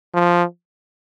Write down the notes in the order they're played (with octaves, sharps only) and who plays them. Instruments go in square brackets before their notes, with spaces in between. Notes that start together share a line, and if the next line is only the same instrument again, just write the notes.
[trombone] F3